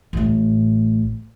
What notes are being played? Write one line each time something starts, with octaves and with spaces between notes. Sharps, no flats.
A1 A2